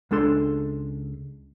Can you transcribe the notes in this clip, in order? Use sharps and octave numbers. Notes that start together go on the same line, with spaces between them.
C#2 G#3 D4 A4 C6